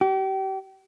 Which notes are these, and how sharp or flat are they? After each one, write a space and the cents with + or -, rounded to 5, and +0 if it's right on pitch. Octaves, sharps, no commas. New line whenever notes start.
G4 -35